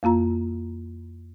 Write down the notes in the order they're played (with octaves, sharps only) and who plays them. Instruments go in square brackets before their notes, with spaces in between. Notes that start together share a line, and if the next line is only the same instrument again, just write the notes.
[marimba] F2 A#3 F4 A#5